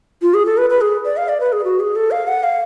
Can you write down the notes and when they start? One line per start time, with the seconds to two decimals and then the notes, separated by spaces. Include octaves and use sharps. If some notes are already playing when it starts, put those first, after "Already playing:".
0.22 F4
0.34 G#4
0.46 A4
0.58 B4
0.70 B4
0.81 G#4
1.05 D5
1.17 F5
1.29 D5
1.40 B4
1.52 G#4
1.64 F#4
1.80 G#4
1.96 A4
2.11 F5
2.28 F#5
2.43 F5